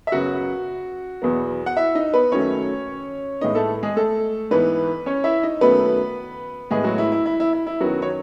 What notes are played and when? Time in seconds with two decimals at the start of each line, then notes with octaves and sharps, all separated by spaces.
0.07 E5
0.12 F#2 C#3 F#3 B3 F#4 F#5
1.22 E2 B2 F#3 B3
1.66 F#5
1.77 E4 E5
1.95 D#4 D#5
2.14 B3 B4
2.32 F#2 D#3 F#3 A3 C#4 C#5
3.41 A2 G#3 B3 D#4 D#5
3.55 A3 A4
3.83 G#3 G#4
3.96 A3 A4
4.51 G#2 E3 B3 B4
5.06 C#4 C#5
5.24 E4 E5
5.43 D#4 D#5
5.61 F#2 D#3 F#3 A3 B3 B4
6.71 A2 G#3 B3 G#4
6.84 F#3 F#4
6.98 E4
7.12 E4
7.26 E4
7.40 E4
7.53 E4
7.67 E4
7.80 F#2 D#3 F#3 B3 F#4
8.02 C#5